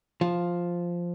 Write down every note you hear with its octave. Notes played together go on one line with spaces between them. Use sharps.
F3